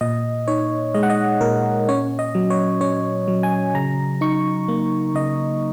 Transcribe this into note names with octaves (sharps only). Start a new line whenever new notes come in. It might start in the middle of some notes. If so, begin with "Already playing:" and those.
A#2 D#5
D#4 C#5
G#3 D#5
F#5
D#5
A#2 A#4
C#4 C#5
D#5
F#3
C#5
C#4 C#5
F#3
G#5
C#3 A#5
D#4 C#6
A#3
C#3 D#5